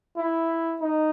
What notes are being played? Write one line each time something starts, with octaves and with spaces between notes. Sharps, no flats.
E4
D#4